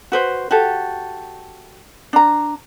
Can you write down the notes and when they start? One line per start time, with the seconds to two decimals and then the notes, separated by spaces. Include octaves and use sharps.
0.12 F#4 B4 C5
0.51 F#4 G4 A4
2.13 D4 A#5